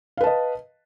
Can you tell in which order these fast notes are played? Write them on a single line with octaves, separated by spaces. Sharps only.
F5 B4 A5 D#5